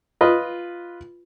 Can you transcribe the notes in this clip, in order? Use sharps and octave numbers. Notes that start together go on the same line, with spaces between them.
F4 B4 D#5